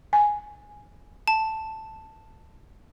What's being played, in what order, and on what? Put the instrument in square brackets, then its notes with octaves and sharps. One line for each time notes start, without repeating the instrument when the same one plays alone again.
[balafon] G#5
[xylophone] A5